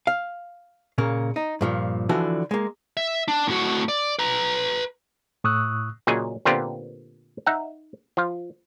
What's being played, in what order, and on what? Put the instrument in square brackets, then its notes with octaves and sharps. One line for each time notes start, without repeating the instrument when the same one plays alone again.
[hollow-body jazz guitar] F5
A#2 C#3 A#3
D#4
G2 A#2 F3
D3 E3 F3 F#4
G#3 A#3
[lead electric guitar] E5
D4
A2 F#4
D5
B4 A#5
[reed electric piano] A2 C#6 D#6 E6 F#6
[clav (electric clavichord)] A#2 C#3 F#3 G#4 D#5 G#5
A#2 D3 B3 C4 F4 G4
D#4 E5 F#5
F3 F4